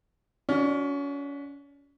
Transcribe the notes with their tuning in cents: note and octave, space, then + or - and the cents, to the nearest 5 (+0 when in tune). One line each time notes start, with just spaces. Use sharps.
C#4 +30 F#4 -20 D5 +15